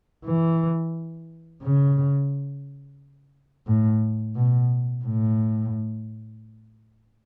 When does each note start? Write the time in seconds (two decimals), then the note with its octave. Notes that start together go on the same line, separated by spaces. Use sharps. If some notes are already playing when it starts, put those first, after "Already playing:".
0.25 E3
1.62 C#3
3.67 A2
4.36 B2
5.05 A2